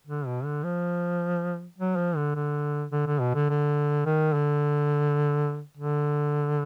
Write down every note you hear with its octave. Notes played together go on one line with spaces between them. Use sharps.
D3
B2
D3
F3
F#3
F3
D3
D3
D3
D3
B2
D3
D3
D#3
D3
D3